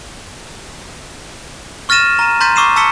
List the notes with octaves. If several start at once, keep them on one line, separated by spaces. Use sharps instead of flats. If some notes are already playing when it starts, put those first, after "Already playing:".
C#6 F6 A6 A#6 D#7 E7
A#5 D#7
A#5 C6 G6 A6 B6 D#7
C#6 D6 E6 C7 D#7 E7
A5 C#6 E6 B6 C#7 G7